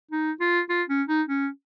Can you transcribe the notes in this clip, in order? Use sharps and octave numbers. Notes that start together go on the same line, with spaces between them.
D#4
F4
F4
C#4
D#4
C#4